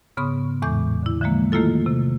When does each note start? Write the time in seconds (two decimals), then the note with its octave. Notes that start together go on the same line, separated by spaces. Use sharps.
0.17 G#2 C#3 B3 B5 C#6 D#6
0.62 E2 A2 E3 G#3 D6 G6
1.03 D3 E4
1.21 D3 E3 F3 G#3 A#3
1.52 D#3 A3 A#3 E4 F4 A4
1.86 C3